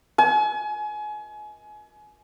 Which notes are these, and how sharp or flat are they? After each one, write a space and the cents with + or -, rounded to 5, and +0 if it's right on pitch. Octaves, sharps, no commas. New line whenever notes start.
G#5 +30